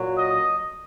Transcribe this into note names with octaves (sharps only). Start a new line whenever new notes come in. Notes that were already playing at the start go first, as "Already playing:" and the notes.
Already playing: A#2 F#3
D#5